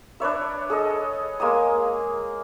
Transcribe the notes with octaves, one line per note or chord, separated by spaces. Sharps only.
D4 B4 C#5 E5
G#4 A4 D#5
G#3 A#3 G#5 D#6